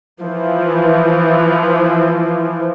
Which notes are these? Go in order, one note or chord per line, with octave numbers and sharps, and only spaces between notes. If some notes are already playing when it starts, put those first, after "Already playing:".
E3 F3